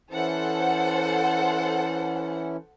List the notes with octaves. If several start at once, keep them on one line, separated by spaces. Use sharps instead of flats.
E3 C#4 E4 A4 C5 F#5